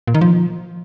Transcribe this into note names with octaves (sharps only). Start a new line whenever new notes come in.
A#2
D#3
F3